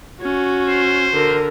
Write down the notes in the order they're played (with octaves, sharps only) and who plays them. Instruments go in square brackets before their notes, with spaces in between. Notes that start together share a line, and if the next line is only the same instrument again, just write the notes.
[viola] C#4 [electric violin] F#4
[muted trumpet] C5
[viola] D3 A#4